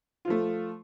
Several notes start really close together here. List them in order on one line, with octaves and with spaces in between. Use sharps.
F4 F3 A3